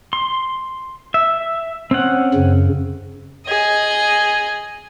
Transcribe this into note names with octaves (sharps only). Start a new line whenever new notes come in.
C6
E5
C4 C#4 F#5
F#2 C#3
G#4 D#5